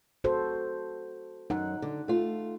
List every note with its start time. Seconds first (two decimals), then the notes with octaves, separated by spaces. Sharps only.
0.24 F#4 A4 C5
1.50 F#2 D#4 F#5
1.82 D3
2.08 A3 F4